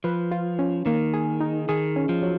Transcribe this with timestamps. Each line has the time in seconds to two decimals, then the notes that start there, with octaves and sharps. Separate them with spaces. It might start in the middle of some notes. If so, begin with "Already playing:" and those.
0.04 F3 B4
0.31 F4
0.59 C#4
0.86 D#3 A#3
1.14 G#4
1.40 D#4
1.69 D#3 G#4
1.96 C#4
2.09 F3
2.22 F#3